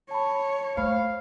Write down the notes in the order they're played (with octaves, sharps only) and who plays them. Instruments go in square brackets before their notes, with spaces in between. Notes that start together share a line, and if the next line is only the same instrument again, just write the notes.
[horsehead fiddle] C#5 [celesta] A5 B5
[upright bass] A3 [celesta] C5 B5 [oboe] F5